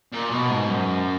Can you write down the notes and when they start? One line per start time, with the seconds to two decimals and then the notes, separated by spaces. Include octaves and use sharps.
0.13 A#2
0.31 B2
0.50 G#2
0.68 F#2